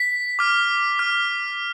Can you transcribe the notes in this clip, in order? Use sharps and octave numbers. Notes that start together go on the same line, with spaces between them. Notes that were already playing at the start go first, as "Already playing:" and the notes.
Already playing: B6
D6 F6
D6 F6